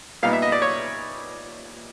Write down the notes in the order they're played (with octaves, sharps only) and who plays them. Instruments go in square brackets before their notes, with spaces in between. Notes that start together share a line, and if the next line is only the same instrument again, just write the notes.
[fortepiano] A#2 G3 B3 D#4 F5
E5
D#5
D5
C#5